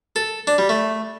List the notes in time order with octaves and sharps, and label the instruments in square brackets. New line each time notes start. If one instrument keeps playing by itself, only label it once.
[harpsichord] A4
D4
G3
A3